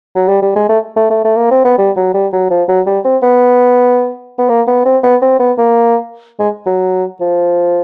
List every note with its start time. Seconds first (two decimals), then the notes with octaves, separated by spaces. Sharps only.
0.15 F#3
0.28 G3
0.42 G3
0.56 G#3
0.69 A3
0.96 A3
1.10 A3
1.24 A3
1.37 A#3
1.51 C4
1.65 B3
1.78 G3
1.96 F#3
2.14 G3
2.33 F#3
2.50 F3
2.68 F#3
2.86 G3
3.04 C4
3.23 B3
4.38 B3
4.49 A#3
4.67 B3
4.85 C4
5.03 B3
5.22 C4
5.39 B3
5.58 A#3
6.39 G#3
6.66 F#3
7.21 F3